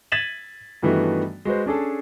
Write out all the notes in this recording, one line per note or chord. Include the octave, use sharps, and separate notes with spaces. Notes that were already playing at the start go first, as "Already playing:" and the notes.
G#6 A6 B6 D#7 E7 F#7
G2 D#3 E3 A3 B3 F#4
G#3 F#4 B4 C5
C#4 D4 G#4 A4